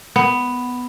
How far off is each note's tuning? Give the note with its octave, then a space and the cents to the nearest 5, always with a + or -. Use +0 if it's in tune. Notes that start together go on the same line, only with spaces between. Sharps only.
B3 +5